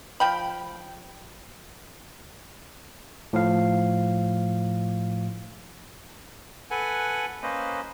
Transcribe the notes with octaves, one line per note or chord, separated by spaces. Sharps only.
F3 G5 B5
A2 F3 F5
A4 B4 F#5 G#5
A#3 C#4 B4 C5 D#5